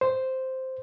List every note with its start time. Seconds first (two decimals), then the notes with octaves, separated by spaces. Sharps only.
0.01 C5